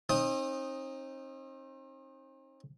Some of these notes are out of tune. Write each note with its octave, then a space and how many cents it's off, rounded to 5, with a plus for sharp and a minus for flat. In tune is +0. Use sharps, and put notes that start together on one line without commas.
C4 +40 D#4 +0 D#6 +15